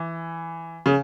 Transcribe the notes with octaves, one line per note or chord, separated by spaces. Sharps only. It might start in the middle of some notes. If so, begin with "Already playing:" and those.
Already playing: E3
C#3